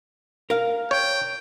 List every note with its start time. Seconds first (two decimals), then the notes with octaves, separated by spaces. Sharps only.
0.50 A#4 F5
0.91 C#5 G5